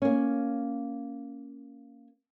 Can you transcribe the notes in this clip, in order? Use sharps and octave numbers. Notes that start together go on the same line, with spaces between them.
A#3 C#4